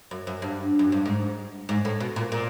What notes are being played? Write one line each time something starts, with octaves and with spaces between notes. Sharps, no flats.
F#2
F#2
G2
F#2
G2
G#2
G#2
A2
B2
A#2
A#2